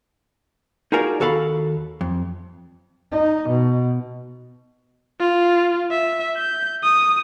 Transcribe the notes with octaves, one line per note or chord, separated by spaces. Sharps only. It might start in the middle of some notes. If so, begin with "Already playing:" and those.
D#4 F4 F#4 G#4 A#4 D5
D#2 F#4 A4 F5 B5
F2
D#4
B2
F4
E5
G6
D#6